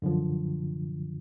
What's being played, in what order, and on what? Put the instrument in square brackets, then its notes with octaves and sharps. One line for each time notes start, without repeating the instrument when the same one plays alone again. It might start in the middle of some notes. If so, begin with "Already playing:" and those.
[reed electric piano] F#2 D3 F3